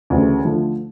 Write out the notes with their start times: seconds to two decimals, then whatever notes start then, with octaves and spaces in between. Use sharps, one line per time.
0.10 D2 C#3 E3 A3
0.44 D3 F3 A3